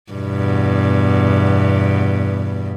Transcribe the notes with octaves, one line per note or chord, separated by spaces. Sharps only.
E2 G2 B2